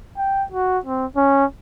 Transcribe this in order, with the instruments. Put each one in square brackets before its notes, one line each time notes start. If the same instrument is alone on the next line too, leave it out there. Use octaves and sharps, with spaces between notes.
[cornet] G5
F#4
C4
C#4